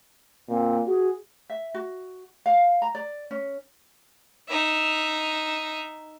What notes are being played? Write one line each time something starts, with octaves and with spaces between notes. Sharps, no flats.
A#2 C4
F#4 G#4
E5
F#4
F5
A#5
D5
C#4
D#4 E5